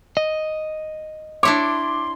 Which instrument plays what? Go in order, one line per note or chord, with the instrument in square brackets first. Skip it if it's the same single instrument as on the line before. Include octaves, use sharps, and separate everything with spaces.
[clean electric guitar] D#5
[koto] D4 E4 C#5 [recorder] C6 [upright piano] D6